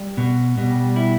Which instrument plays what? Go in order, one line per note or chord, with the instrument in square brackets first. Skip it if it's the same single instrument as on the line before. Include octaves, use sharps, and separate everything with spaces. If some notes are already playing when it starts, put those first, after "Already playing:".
Already playing: [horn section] G3
[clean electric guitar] B2
[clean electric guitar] B2 [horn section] G3
[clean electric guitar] E4